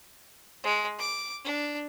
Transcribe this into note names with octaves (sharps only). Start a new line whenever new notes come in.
G#3
D6
D4